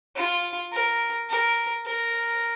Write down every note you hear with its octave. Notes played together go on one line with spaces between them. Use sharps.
F4
A#4
A#4
A#4